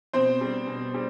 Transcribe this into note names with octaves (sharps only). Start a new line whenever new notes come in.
B2 C4 C5
G3
B2
G3